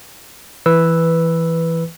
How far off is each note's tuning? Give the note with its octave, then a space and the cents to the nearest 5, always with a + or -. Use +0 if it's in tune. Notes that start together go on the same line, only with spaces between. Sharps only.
E3 +5 B4 +0 E6 +0